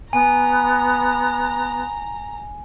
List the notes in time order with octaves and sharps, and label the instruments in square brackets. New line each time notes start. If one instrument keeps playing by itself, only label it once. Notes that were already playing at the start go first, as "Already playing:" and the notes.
[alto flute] B3 [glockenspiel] G#5 [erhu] A#5